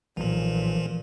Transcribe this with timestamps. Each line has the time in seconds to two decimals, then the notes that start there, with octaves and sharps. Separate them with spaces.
0.17 B1 A#2 E3 F3